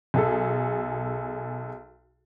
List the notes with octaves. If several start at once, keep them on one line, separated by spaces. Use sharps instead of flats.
B1 G#4 A4